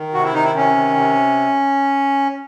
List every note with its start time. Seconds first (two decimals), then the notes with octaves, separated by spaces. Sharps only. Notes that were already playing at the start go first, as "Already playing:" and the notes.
Already playing: D#3
0.14 C3 F#4
0.24 E4
0.34 D#3 D#4
0.44 E4
0.55 C3 C#4
0.75 D#3
0.96 C3